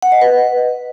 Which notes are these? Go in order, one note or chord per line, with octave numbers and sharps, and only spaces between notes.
F#5
D#5
B4